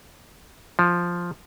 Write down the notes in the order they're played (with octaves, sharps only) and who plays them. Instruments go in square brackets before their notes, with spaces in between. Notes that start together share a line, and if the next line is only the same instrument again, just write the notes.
[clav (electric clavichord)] F3